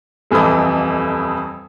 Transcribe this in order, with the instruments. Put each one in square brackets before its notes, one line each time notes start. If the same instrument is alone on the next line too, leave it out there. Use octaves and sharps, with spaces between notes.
[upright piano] D#1 F2 E3 B5 D#6